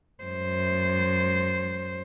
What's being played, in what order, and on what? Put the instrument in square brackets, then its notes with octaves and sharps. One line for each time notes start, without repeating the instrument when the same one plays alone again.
[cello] F#2 C5